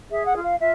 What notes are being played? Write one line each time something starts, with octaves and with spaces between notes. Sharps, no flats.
G#4 E5
F#5
F4
F5
F4 E5